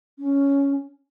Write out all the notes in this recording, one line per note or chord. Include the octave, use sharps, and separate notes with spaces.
C#4